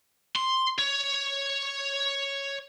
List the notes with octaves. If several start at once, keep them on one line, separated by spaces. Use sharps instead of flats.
C6
C#5